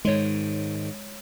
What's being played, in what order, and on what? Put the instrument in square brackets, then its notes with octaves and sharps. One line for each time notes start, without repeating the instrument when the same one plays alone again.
[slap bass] G#2 D#3 [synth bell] G#3 C#5